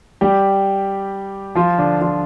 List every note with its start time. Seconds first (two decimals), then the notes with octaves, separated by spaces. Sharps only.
0.21 G3 G4
1.55 F3 F4
1.78 D3 D4
2.01 F3 F4